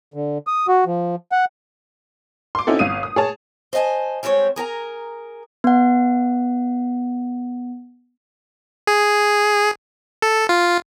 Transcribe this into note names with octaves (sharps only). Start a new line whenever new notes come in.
D3
D#6
F#4
F3
F#5
C6 D6
C4 C#4 D#4 E4 F#4 A4
G1 F5 D#6 D#7
D#6
G#4 C#5 A5
C5 D#5 F5 G#5 A5
G3 G#3 C4 C5 C#5
G#4 A#4 G5 A#5
B3 F#5
G#4
A4
F4